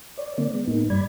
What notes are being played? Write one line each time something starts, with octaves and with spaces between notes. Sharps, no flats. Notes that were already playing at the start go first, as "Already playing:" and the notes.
C#5 D5
D3 A#3 C4 D5
G#3 B3
A2 A#3 B3 D#4
G2 G3 D5 B5 G#6